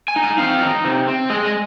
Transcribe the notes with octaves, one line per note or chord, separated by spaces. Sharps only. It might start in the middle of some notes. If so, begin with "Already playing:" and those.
G#5
D#4
G#5
C4 F5
D#4
C3
C4
G#3 D#5
D#5